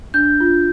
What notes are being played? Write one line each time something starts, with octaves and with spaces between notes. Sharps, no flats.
D4 G6
F4